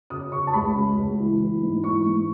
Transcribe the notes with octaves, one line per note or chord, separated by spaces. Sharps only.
C#3 D#6
C#3 C#6
A5
C#2 B5
C#3
C#2
E3
E3
G#2
E3 C#6
G#2